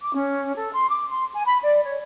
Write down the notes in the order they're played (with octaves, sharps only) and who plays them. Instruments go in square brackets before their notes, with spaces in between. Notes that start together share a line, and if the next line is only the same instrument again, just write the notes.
[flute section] D6
C#4
A4
C6
D6
C6
G#5
B5
D5
C#5